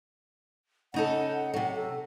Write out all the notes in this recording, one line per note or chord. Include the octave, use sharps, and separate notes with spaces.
C#3 D#4 A4 F#5
C3 F#3
A4